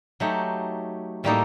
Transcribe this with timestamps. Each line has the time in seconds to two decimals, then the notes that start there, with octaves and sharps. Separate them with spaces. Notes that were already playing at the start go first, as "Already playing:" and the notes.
0.20 F#3 A3 D#4 G4
1.24 A2 G3 A#3 D#4 A4